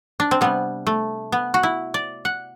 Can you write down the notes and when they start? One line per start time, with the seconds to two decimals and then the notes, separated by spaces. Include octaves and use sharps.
0.20 D4
0.31 C4
0.41 C3 G3 B3
0.87 A3
1.32 B3
1.54 F#4
1.63 E4
1.94 D5
2.25 F#5